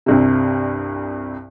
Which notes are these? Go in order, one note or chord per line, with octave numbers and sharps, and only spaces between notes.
C2 G2 C3